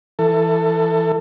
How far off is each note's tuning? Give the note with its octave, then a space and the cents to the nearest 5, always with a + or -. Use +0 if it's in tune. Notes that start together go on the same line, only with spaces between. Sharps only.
E3 +5 A4 +20